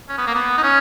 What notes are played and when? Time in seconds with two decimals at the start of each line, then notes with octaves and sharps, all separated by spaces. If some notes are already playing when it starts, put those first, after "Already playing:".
0.09 C#4
0.18 B3
0.27 A#3
0.35 B3
0.58 D#4
0.63 C#4